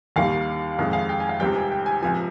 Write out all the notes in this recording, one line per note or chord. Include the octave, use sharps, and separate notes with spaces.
D#2 D#3 G3 F5
F2 D#3 G#3 F5
F5
G5
G#5
F5
C#2 C3 D#3 G3 C4 G5
G#5
G5
G#5
C#2 C3 F3 G#5